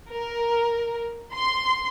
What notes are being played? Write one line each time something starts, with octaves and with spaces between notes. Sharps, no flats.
A#4
C6